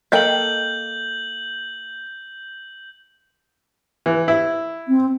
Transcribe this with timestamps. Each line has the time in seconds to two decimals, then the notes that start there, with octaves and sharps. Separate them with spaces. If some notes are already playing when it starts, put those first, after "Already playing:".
0.12 A#3 A4 D#5 G5 G6 F#7
4.06 E3
4.28 E4
4.88 C4